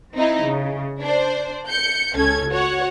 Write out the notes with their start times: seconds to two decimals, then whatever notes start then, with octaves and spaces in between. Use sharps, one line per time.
0.14 C4 D#4 E4
0.45 C#3
1.02 D4 C5
1.68 G6 C#7
2.15 C#2 C#4 A4 G#6
2.49 F#4 C#5 F#5